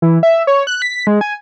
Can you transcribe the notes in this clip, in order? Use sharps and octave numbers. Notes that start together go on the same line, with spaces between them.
E3
E5
C#5
F#6
B6
G#3
G#5